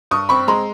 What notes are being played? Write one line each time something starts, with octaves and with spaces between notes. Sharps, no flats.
G2 C#6 D#6
C4 B5 C#6
G#3 A#5 C6